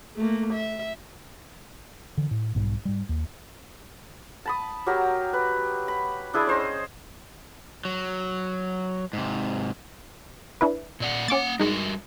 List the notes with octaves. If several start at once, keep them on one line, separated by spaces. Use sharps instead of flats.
A3 A#3
E5
D3 E3
A2
B1 G#2 F#3 G3
G#2 G3
D#2
A5 B5 D#6
F#3 G4 A#4
B4
B5
D4 E4 G#4 D5
C#4 C5 D#5
F#3
G#2 C3
D4 E4 B4
A#2 D5 F#5
A#3 C#4 F#5 D6 A6
G3 G#3 D#4 F#4 A#4